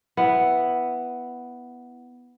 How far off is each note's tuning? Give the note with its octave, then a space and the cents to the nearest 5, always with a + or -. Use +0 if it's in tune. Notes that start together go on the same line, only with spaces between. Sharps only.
B3 +0 E4 +0